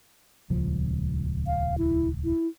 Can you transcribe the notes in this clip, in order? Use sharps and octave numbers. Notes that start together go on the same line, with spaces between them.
D#1 C#2 F3
F5
E4
E4